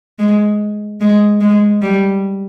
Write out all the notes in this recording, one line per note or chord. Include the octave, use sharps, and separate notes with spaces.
G#3
G#3
G#3
G3